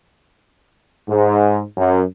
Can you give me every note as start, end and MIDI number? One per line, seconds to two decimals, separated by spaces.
1.09 1.62 44
1.77 2.02 42